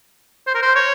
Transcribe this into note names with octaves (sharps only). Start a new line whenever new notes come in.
C5
A#4
C5
C#5